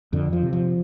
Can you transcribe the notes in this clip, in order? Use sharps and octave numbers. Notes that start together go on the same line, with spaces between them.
F2 D3
F3
C3
F3